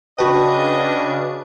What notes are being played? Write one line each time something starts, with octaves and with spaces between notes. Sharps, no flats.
C#3 D4 F#4 B4 D#5 G5 A5 B5